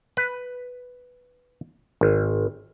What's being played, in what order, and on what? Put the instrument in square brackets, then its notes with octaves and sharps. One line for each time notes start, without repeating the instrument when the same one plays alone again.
[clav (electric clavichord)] B4
G#1